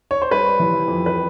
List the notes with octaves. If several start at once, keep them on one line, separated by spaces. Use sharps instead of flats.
C#5
C5
G3 B4
E3
F2
B4